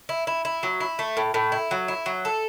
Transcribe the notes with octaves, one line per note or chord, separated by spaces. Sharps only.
E4
E4
E4
F#3
E4
A3
A2
A2
E4
F#3
E4
F#3
A4